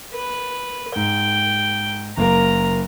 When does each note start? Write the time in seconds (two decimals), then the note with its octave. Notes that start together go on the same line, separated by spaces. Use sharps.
0.14 B4
0.96 G#2 G5
2.17 F#1 A#3 A#4 A#5